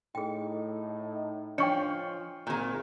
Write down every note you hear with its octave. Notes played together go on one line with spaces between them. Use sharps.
A2 D#4 G#4 G5
F3 D4 C#5 D#5 G5 C#6 C#7
G#1 A#2 D#3